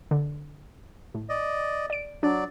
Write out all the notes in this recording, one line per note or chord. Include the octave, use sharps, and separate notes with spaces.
D3
A2
D5 D#5
D5 D7
F#3 D4 D5